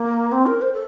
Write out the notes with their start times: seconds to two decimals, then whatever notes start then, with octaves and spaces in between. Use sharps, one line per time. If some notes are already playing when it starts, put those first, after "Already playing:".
Already playing: A#3
0.31 C4
0.46 A#4
0.61 C5
0.73 A4